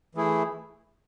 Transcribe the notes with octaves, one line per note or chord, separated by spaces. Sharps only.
E3 A3 E4 G#4